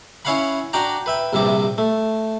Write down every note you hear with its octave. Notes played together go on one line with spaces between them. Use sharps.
C#4 E4 C#5 F5 F#5 B5
D4 F#4 D5 F#5 G5 A#5
B4 E5 G5
A#1 G2 C3 E5 D6
A3